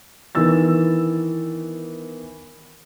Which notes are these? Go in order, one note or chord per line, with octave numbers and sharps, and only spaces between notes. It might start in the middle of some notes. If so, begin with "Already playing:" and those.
D#3 E3 B3 E6 A6